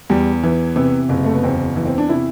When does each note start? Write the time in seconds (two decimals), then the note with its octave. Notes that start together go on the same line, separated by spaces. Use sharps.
0.10 E2 G3
0.43 E3
0.76 C3 B3
1.09 F#1
1.24 A3
1.35 B3
1.43 E2 C4
1.76 E3
1.85 C4
1.98 D4
2.09 C3 E4